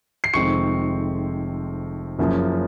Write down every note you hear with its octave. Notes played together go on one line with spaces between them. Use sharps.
C7
F1 F2 D#3 G#3 C4 C#6 C#7
F#1 F#2 C#3 F3 A#3